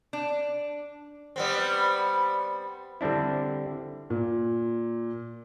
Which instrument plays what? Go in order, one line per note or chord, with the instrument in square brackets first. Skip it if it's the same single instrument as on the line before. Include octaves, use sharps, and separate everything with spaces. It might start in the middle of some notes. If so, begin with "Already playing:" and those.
[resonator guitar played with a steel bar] D4
[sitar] G3 B3 C4
[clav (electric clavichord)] D3 G3 C4 D4 E4
[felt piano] A#2